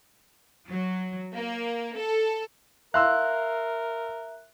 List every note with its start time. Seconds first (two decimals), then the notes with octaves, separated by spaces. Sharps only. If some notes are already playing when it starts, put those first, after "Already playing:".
0.69 F#3
1.35 A#3
1.97 A4
2.94 A#4 E5 F5 C6 E6 F#6